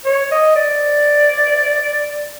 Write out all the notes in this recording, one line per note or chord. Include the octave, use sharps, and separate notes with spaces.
C#5
D#5
D5